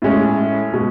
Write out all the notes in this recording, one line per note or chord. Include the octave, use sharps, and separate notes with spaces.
A2 G#3 C#4
B2 G#3